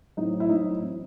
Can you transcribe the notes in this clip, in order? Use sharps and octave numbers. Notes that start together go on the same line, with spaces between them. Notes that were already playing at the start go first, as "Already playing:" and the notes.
A2 F#3 C4 D#4
E4
A2 F#3 C4 D#4
E3 C4